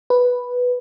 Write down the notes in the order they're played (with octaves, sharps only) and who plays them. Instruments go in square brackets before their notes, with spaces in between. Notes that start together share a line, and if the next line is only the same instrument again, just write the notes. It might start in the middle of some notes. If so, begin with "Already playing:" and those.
[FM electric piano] B4